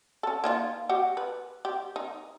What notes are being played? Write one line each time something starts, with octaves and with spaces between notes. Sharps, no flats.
C#4 A4
A#3 D#4 F4
F#4 G4
B4
G4
D#4